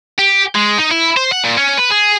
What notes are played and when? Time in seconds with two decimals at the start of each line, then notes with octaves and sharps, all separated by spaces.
0.18 G4
0.55 G#3
0.78 D#4
0.91 E4
1.17 C5
1.32 F#5
1.44 A#2
1.58 C#4
1.78 B4
1.91 G#4